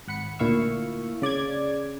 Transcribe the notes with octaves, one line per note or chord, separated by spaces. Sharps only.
G#1 F#5 B5 C#7
D2 A#2 E4 F5 C#6 E6
C#3 D5 D6 G#6